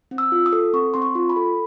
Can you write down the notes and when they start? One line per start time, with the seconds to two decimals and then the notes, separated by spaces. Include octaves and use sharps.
0.11 C4
0.18 E6
0.32 F4
0.46 D#6
0.53 A4
0.74 C4 C#6
0.94 C4 C6
1.02 C#6
1.15 F4
1.30 B5
1.36 A4